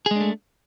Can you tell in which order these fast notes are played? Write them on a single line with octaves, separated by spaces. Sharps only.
G#4 G#3 D4 A3